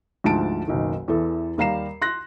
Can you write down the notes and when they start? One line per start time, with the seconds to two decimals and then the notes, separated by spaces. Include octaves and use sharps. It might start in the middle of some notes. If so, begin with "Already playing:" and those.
0.24 D2 G#2 F3 A5 D7
0.68 F#1 B1 D#3
1.08 E2 E3 A4
1.58 D#2 G3 F5 A#5 C7 E7
2.02 C6 F#6 A#6